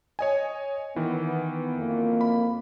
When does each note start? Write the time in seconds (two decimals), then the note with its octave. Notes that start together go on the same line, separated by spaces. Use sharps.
0.19 C#5 D#5 G#5
0.96 D#3 E3 B3
1.76 F2 A#3
2.21 B5